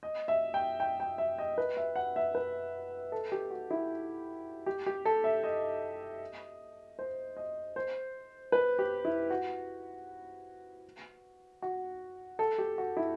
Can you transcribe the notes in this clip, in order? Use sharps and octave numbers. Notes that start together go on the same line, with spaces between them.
D#5
E5
G5
G5
G5
E5
D#5
B4
E5
F#5
E5
B4
A4
G4
F#4
E4
G4
G4
A4
E5
D#5
C5
D#5
C5
B4
G4
E4
F#4
F#4
A4
G4
F#4
E4